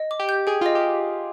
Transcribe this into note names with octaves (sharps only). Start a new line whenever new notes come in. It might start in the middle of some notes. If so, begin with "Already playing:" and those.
Already playing: D#5
D6
G4
G6
G#4 G5
F4
D#5
G4